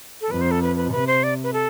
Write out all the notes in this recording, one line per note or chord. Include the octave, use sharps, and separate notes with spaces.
A4
F2 B4
C5
A4
B4
B4
C3 B4
C5
D5
B4
A4